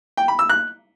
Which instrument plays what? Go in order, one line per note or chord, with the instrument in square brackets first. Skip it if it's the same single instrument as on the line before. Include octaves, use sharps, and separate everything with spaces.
[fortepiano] G5
B5
E6
F#6